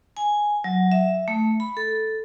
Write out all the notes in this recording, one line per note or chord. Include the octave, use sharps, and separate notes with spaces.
G#5
F#3
E5
A3
B5
A4